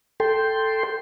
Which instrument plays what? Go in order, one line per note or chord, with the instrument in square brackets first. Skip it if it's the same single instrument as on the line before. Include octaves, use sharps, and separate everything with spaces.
[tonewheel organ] A4 G5 C6